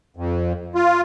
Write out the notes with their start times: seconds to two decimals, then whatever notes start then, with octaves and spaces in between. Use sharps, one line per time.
0.17 F2
0.75 F4